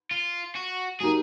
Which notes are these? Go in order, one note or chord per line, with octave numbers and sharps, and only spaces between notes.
F4
F#4
F#3 A#3 D#4 G4 G#4 A#4